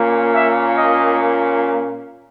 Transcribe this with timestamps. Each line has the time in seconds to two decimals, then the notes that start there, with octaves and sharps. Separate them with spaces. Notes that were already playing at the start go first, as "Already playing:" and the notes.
Already playing: A#2 A#3 C#4
0.34 E5
0.78 D#5